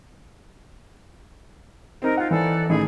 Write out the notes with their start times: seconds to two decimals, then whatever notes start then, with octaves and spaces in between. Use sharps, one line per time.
2.02 C4 D#4 A#4
2.17 F4 F#5
2.31 E3 A4 D5
2.69 A1 D#3 G#4 B5